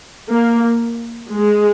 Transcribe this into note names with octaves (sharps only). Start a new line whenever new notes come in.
A#3
G#3